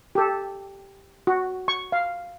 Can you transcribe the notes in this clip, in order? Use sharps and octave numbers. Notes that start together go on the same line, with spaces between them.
G4 A4
F#4
C#6
F5